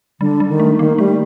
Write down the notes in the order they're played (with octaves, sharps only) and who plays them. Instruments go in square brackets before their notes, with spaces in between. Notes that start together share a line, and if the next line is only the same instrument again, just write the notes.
[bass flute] D3 [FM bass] G3
[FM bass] G3
[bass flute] D#3
[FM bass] A3
[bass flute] D#3 [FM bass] A#3
[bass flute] G3 [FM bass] A3